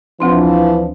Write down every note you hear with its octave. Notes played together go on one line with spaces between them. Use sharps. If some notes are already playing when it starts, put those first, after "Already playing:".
D2 E3 F3 C4 D4 C6